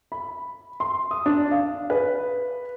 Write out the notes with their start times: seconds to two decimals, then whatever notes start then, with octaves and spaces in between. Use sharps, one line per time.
0.12 B5
0.80 C6
1.11 D#6
1.26 D4
1.51 F5
1.90 B4